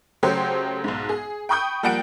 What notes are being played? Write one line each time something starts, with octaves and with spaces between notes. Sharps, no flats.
C#3 F#3 A3 G4 C5 C#5
B1 G#2
G#4
G5 B5 C#6 D#6 G6
F3 G3 A#3 F#5 G5 D7